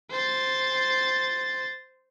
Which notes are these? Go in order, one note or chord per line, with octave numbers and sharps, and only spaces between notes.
C5 A6